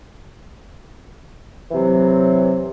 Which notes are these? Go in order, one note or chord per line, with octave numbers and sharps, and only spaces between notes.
C3 E3 F#3